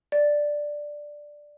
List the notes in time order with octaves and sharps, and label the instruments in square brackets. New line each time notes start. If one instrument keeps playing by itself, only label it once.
[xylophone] D5